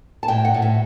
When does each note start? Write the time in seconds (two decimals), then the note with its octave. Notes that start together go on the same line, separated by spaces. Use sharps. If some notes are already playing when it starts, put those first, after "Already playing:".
0.23 A5
0.28 A2 G5
0.45 F#5
0.54 A2
0.62 E5